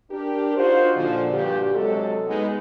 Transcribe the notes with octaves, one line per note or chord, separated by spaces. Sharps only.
D4 G4 A#4
D#4 F4 F#4 C5
A#2 D3 F3
G2 A#2 F#4 G4
C3 F#3 G#3 F#4 A4
G#3 B3 D#4